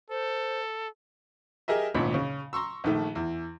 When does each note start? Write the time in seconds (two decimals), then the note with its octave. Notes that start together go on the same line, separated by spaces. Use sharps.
0.10 A4 C5
1.68 G4 G#4 A#4 D#5 E5
1.94 G#1 D2 A#2 C#3 B5
2.14 C#3
2.53 A#5 C6 C#6 E6
2.84 A#1 D#3 A3
3.15 E2